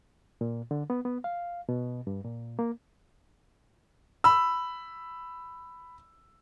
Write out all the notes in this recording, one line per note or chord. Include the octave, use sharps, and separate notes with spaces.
A#2
D3
B3
B3
F5
B2
G2
A#2
A#3
B5 E6